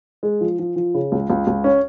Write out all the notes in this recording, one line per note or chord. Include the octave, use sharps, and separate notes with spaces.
G#3
F3
F3
F3
C#3
C#2
C#2
C#2
C#4